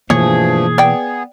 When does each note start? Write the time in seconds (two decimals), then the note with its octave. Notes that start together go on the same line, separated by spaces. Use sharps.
0.10 G2 B2 E3 F3 A3 A#3 G#4 C#5
0.78 B3 D5 G5